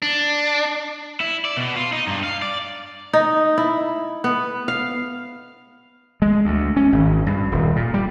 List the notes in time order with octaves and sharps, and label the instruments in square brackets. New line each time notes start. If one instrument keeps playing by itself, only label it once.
[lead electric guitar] D4
[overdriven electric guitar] E4
D5
B2
F4
D#4
G2
F5
D5
[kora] D#4
E4
B3
F5
[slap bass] G#3
D2
C#4
G#1
G2
D#1
A#2
G3